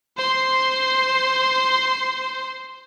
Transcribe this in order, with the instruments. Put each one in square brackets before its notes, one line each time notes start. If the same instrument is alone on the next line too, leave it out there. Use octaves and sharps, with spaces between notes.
[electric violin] C5 C6